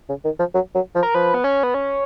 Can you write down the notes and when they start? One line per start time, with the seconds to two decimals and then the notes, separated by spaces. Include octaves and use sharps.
0.09 C#3
0.25 D#3
0.39 F3
0.54 F#3
0.75 F#3
0.95 F3
1.03 A#4
1.14 F3 B4
1.34 B3
1.44 C#4
1.63 B3
1.74 C#4